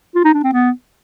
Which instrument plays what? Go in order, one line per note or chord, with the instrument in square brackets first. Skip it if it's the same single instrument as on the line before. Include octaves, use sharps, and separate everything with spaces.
[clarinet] F4
D#4
D4
C4
B3